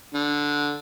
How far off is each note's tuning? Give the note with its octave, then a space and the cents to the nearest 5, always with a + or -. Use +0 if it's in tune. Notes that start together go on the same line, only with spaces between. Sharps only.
D3 -5